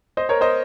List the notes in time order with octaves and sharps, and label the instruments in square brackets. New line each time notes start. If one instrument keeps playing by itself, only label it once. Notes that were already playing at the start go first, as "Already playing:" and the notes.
[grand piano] C5 D#5
A#4 C#5
C5 D#5